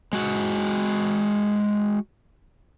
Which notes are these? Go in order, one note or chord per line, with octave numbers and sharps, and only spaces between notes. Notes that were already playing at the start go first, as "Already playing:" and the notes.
G#3 F#4